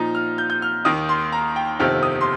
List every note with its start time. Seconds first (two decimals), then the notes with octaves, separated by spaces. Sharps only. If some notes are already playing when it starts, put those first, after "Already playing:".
Already playing: A#2 F3 D#4 A#5
0.15 F6
0.38 G6
0.50 G6
0.62 F6
0.85 D#2 D#3 A#3 D#6
1.09 C6
1.32 A#5
1.56 G5
1.79 G1 F2 C3 D#3 C4 F6
2.03 D#6
2.21 C6